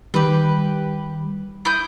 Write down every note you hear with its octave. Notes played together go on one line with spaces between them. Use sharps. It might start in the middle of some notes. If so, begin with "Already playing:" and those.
D#3 G3 G4 B4
E4 D#6 G6